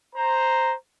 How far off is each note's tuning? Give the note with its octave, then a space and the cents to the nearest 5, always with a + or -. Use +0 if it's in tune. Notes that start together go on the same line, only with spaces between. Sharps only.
C5 +0 A#5 +0